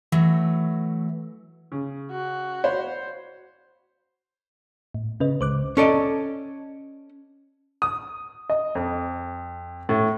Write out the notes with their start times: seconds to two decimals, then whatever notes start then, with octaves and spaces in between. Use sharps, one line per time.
0.12 E3 F#3 A3
1.72 C#3
2.11 F#4
2.64 C5 C#5 B5
4.94 A2
5.20 C#3 C#4 B4 D#5
5.41 C#2 C5 D6 F#6
5.77 C#4 A4 D5 D#5
7.82 D#6
8.50 D#5
8.75 F2
9.89 A2